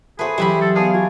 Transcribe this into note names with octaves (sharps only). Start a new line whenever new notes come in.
A3 F#4 G#4 B4 C5 D5
E3 F#3 G3 E4 G4 B5
A4
B3 G#4 D5 F5 A5
F#4 G#5